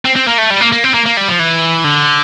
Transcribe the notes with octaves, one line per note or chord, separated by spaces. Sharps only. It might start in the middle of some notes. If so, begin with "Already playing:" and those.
C4
C4
A#3
A3
G3
A#3
A#3
C4
A#3
A#3
G3
F3
E3
D3